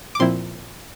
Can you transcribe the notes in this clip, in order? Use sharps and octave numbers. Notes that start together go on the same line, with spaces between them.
D6
A#2 F3 C4 E4 C6